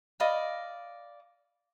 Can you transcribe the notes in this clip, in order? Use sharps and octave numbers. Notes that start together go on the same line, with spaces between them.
D5 D#5 F5 B5